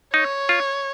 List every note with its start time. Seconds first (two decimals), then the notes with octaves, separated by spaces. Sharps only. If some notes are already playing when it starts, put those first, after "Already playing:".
0.14 D#4 C#5
0.49 F4